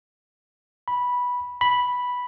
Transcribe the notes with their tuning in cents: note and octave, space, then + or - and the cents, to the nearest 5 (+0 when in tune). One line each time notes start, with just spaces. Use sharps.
B5 -10
B5 -5